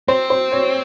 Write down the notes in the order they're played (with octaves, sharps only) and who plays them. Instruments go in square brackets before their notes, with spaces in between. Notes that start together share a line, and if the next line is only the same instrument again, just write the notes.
[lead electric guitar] C4 [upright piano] C5
[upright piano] C5
C#5